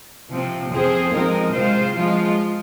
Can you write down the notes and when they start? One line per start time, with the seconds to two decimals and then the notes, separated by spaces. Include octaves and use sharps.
0.30 C3 F3 C4
0.71 F2 F3 C4 G#4 C5
1.13 F3 G#3 C4 D#4 A#4
1.53 C3 G#3 F4 C5
1.95 F3 G#3 F4